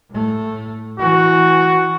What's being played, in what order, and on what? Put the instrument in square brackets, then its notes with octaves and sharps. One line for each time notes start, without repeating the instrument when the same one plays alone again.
[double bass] A2 A3
[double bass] E3 [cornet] F#4